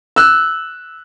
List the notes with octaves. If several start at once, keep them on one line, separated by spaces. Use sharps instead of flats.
E6 F#6